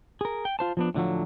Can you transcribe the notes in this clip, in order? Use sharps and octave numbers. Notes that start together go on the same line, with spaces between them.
G#4 A#4
G5
F4 C5 A5
F3 B3 D4
A2 D3 F3 F#3